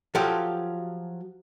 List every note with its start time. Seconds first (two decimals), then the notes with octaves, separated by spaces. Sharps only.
0.15 F3 F#3 F4 G4 A4